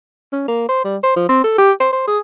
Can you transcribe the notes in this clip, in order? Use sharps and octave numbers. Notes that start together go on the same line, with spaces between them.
C#4
A#3
C5
G3
C5
F3
C4
A4
G4
C5
C5
G#4